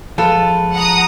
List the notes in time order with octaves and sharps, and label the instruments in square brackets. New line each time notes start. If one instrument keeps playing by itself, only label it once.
[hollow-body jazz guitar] F3 G#3 [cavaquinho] F4 A4 B4
[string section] F#5 A#5 D#6